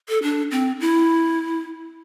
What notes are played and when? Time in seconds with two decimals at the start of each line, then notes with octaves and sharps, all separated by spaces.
0.09 A4
0.23 D4
0.51 C4
0.81 E4